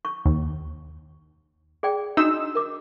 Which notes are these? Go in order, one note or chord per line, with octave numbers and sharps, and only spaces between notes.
C#6
D#2
G#4 D5 G5
D4 D#4 F#4 D#5 E6
A#4 D6